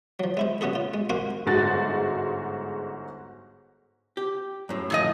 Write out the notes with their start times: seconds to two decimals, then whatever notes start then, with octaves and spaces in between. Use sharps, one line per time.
0.20 F3 F#3
0.37 G#3 E4 C5
0.61 C#3 B3 F#4 G#4 A4
0.75 F4
0.94 G#3
1.10 A#3 C4 F#4 C5 F5 G#5
1.46 G1 G#2 G#3 F#4 A6
4.17 G4
4.69 F#2 A2
4.90 A#2 F3 D#5